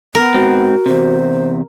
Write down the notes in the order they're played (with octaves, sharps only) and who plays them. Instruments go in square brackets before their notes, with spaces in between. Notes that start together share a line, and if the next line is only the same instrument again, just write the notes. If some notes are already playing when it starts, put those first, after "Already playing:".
[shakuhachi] B3 [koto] A#4
[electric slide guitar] G#2 C4 [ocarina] F#4
[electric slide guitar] E2 C3 [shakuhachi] C5